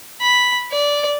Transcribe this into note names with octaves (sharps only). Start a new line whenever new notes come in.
B5
D5